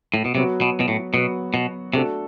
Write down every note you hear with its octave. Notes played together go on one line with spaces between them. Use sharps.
A2
B2
C3 F#3 B3 F#4
B2
B2
A2
B2 F#3 B3 F#4
B2
C3 A3 D4 F#4 A4